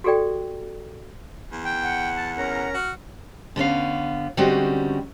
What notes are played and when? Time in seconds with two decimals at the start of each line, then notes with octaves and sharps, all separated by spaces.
0.04 F#4 G4 A4 D5 G5
1.52 E2
1.65 G5
1.83 F#5
2.17 A5
2.38 C#4 A#4 A#5
2.74 F#4 F6
3.56 D3 B3 C#4 F5
4.37 D3 G3 G#3 C4 C#4 F#4